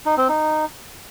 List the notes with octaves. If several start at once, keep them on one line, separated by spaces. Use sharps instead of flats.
D#4
C4
D#4